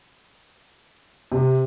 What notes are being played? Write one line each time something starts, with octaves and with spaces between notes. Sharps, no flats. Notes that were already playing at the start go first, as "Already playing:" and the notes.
C3